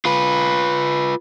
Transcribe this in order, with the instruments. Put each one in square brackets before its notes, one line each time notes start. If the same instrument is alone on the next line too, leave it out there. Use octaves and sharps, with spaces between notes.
[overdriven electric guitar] F4 B4